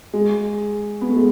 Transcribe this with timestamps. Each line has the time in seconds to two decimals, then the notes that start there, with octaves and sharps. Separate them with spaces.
0.14 G#3
1.01 B3
1.09 A3
1.16 G#3